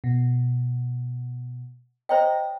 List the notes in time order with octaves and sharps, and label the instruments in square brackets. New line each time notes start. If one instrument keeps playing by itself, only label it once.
[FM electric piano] B2
[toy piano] C5 C#5 G5 [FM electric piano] D#5 A#5